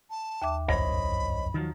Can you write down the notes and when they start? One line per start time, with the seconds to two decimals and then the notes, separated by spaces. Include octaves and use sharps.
0.10 A5
0.42 D#2 E5 D6
0.68 G1 C2 F#2 C5 C#5 D#5 B5
1.54 D#3 F3 F#3